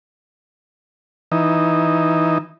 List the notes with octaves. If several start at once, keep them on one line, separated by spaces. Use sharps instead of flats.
E3 D#4